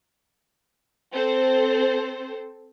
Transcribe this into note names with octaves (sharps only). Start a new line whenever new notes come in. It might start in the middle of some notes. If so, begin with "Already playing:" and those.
C4 A4 C5